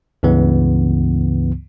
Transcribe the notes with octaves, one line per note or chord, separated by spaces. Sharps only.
C#2 G2 C#3 E3 B3